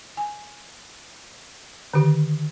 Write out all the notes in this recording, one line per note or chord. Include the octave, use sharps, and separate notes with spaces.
G#5
D3 D#3 G4